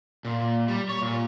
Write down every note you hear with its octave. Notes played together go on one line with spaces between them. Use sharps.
A#2
G3
C#5
A#2